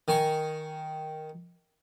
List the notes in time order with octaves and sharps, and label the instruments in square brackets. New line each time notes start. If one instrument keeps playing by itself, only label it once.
[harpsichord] D#3 G#5 C#6